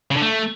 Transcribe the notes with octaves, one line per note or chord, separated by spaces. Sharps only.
C#3
D3
A3